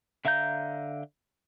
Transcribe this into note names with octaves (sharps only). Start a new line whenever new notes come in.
D3 E5 F5 A#5 G6